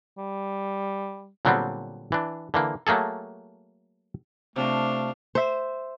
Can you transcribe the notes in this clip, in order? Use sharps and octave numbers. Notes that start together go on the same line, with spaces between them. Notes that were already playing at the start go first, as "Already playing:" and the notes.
G3
A#2 D3 F#3 G3 B3 C4
E3 D4
D3 E3 A#3
F#3 A3 A#3 G#4 A4
C3 A3 C4 D4 F4 F5
C5 E5